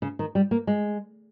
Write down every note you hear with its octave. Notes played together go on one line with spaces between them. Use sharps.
C#3
D#3
G3
A#3
G#3